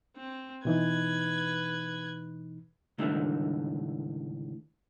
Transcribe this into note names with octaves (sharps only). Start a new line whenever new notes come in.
C4
B2 E3 D#4 B4 G#6
C#2 A2 D3 D#3 G3 A3